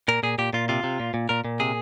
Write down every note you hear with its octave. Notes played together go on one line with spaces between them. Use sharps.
A#2 A#4
A#2 G#4
A#2 G4
A#2 F4
C3 F4
C3
A#2
A#2
A#2 A#4
A#2
C3 G#4